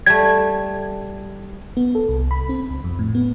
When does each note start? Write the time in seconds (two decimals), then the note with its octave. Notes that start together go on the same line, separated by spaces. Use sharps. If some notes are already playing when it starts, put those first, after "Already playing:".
0.06 G3 A3 G#6
1.77 B3
1.95 A4
2.08 C2
2.31 B5
2.49 C4
2.70 C#2
2.84 F2
2.99 A2
3.15 B3